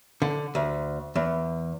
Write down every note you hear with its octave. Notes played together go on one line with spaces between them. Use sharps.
D3
D2
E2